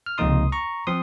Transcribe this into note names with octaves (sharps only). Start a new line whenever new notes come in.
F6
C#2 C3 F3 A#3 D#4 C6 D#6
A#5 C#6
F3 C4 C6 D#6